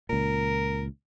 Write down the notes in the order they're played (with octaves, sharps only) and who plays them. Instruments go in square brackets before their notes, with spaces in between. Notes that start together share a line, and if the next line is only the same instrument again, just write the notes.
[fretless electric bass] C#2 A#2 [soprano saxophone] A#4